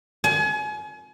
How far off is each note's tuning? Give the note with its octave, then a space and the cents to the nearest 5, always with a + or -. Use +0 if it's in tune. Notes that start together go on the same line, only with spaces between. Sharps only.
G#5 +35